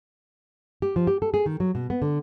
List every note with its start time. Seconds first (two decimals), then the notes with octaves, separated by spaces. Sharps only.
0.82 G4
0.96 F3
1.07 G4
1.22 A4
1.34 G#4
1.46 D#3
1.60 F#3
1.75 B2
1.90 B3
2.02 D3